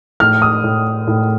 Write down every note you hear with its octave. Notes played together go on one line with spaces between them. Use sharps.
A2 F6
D#6
A2
A2